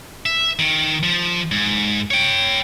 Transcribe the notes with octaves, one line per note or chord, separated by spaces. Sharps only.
E5
D#3
F3
G#2
C#5 G5